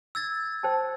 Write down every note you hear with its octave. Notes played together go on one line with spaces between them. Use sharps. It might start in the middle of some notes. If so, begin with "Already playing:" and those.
E6 G#6 A6
C5 G5 A5